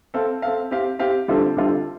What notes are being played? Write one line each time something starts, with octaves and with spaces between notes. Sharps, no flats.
C4 A4 F5
C4 A4 F5
C4 G4 F5
C4 G4 F5
D3 G3 C4 F4 A4
D3 G3 C4 F4 A4